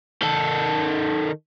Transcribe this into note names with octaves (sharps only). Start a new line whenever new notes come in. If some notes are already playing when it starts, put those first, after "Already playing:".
D#3 A4